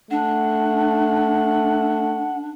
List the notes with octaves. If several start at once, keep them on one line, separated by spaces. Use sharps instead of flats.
A3 D4 F#5